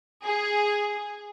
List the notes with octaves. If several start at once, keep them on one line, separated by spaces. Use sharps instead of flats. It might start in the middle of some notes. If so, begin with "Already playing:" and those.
G#4